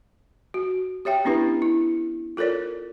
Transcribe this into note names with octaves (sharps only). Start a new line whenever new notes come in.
F#4
G4 C#5 E5 G5
B3 C#4 D4 E4 G4 B4
E4
F4 A4 A#4 C#5 D5